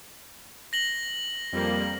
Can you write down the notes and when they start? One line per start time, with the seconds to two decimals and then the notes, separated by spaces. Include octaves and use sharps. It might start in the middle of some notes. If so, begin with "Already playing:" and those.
0.73 A#6 F#7 G7
1.52 F2 G3 A#3